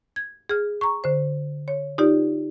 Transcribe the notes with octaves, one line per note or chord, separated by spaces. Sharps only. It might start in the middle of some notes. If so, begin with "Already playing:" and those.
G#6
G#4 F6
A#5 C#6
D3 C5
C#5
D#4 F4 G4 D5